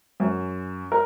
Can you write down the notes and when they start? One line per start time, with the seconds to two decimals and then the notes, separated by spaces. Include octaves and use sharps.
0.20 F#2
0.92 A#4